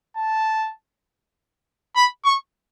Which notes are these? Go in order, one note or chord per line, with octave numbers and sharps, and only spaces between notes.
A5
B5
C#6